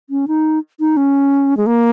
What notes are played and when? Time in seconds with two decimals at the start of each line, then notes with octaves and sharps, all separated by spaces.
0.10 C#4
0.28 D#4
0.80 D#4
0.97 C#4
1.57 G#3
1.66 A#3